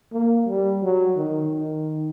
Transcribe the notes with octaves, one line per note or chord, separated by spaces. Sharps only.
A#3
G3
F#3
D#3
D#3